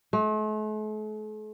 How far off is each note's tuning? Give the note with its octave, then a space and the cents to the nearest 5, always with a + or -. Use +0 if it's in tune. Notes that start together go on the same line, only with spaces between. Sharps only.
A3 -45